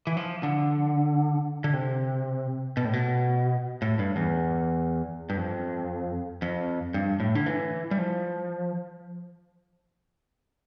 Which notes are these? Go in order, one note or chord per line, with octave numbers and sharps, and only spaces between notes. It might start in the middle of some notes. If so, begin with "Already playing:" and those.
E3
F3
D3
D3
C3
B2
A2
B2
A2
G2
E2
G2
F2
F2
G2
A2
D3
E3
G3
F3